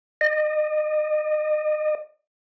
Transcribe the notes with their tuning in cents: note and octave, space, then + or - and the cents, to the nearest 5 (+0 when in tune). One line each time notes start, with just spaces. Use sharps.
D#5 -30